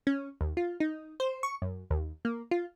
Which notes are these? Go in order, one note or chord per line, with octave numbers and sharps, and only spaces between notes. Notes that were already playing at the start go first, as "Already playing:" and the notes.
C#4
D#2
F4
D#4
C5
C#6
F#2
D#2
A#3
F4